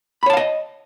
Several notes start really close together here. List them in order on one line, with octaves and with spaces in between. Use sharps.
B5 C#5 A5 F5 D#5